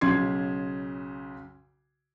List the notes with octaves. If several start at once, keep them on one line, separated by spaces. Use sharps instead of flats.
B1 C#3 C6 G#6 C7